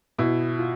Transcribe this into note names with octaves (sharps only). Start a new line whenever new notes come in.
B2 E4
F4